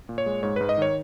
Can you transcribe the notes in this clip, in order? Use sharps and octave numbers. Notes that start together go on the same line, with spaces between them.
A#2
C#5
G#3
G#2 C#5
G#2 B4
D#5
D#3 C#5